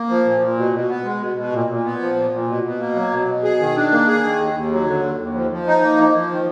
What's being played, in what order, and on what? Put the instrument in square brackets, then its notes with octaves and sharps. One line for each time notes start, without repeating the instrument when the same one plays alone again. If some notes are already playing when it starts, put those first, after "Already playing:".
Already playing: [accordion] A#3
F3
A#2
A#2
B2
B2
B3
G#3
B2
B2
A#2
A#2
B3
F3
A#2
A#2
B2
B2
A#3
F#3
B2
B2
G#4
D#3
D4
A#3
G#4
D#3
D#2
D#2
F#3
D3
D#2
D#2
F3
F3
D#4
A#3
F3
F3
D#3